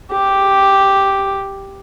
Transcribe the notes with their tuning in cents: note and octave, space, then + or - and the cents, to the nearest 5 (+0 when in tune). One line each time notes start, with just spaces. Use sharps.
G4 +0